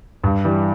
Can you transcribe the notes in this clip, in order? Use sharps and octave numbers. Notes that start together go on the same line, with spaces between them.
G2
E3 G3